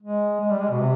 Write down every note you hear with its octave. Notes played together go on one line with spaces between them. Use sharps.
G#3
G#3
G3
G#3
B2
C3